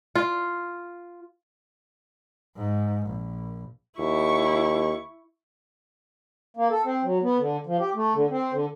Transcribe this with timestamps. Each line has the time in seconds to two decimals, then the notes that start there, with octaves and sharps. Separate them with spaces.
0.15 F4
2.57 G#2
3.06 A#1
3.99 D#2 E4 C#6
6.57 A#3
6.70 A4
6.85 C4
7.04 F#3
7.23 B3
7.38 D3
7.66 F3
7.79 G4
7.95 A3
8.15 D3
8.30 C4
8.53 D3